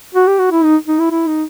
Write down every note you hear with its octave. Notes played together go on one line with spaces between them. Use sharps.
F#4
G4
F#4
E4
D#4
D#4
E4
E4
D#4